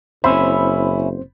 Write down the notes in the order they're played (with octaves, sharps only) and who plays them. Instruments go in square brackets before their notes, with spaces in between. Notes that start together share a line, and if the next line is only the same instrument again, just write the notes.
[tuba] F#1 [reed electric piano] C4 C5 [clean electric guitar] C#4 E4 [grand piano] B5